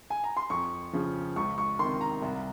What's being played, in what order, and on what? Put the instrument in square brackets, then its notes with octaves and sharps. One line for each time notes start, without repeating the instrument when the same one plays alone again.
[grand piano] G#5
A#5
C6
F2 C#6
C#3 F3
C#2 C#6
C#6
C3 D#3 C6
A#5
C2